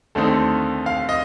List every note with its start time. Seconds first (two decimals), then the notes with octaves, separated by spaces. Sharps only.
0.15 D#2 D3 A3 C4 D#4 A4
0.86 F5
1.09 D#5